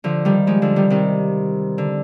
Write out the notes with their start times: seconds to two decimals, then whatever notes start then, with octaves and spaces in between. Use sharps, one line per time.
0.04 D3 F3
0.25 D#3 G3
0.47 F3 G#3
0.62 D3 F3
0.76 D#3 G3
0.90 C3 D#3
1.78 D3